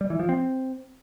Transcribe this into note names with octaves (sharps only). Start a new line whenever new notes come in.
G3
E3
F3
C4